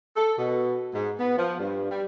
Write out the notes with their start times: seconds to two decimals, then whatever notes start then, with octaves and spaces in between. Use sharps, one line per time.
0.16 A4
0.37 B2
0.93 G#2
1.19 B3
1.37 F3
1.59 G2
1.90 G3